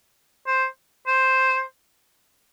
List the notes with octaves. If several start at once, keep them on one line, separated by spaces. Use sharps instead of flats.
C5
C5